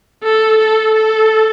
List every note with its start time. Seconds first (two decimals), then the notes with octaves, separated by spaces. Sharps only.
0.23 A4
0.58 A4
0.94 A4